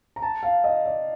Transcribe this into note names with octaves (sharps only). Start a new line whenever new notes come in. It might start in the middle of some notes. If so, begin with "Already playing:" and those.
A#5
A5
F5
D#5
D5